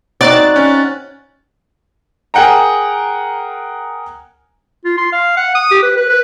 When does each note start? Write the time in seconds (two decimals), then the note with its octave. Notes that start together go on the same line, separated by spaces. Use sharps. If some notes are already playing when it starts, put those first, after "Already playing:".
0.21 C4 D#4 F#4 D5 F#6 A6
0.56 C#4
2.34 G#4 A#4 F#5 G5 A#5
4.85 F4
4.98 C6
5.13 F5
5.37 F#5
5.55 D#6
5.71 G4
5.83 B4
5.97 B4
6.10 B4